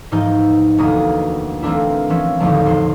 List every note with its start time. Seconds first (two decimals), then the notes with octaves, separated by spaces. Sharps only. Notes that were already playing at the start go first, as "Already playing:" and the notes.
0.12 G#2 E3 F3 D#4 D#5 G6
0.78 E1 D2 B2 A#3 D#6
1.62 E3 A3 A#3 C4 D4 E4
2.10 E3 F3 C#4 E5
2.40 A1 D#2 D3 D#3 F3 A3
2.66 E2 E3 C5